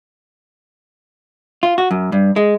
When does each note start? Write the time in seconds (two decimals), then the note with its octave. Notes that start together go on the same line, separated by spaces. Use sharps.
1.63 F4
1.78 F#4
1.91 F#2
2.12 G2
2.36 G#3